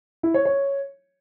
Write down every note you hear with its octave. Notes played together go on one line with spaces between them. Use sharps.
E4
C#5
C#5